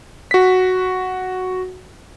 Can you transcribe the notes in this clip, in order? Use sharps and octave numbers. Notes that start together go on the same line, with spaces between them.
F#4 B6